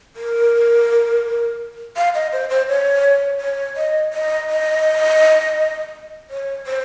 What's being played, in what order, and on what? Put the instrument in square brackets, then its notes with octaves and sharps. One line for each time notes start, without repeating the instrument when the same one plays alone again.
[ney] A#4
F5
D#5
C5
C5
C#5
C#5
D#5
D#5
D#5
C#5
C5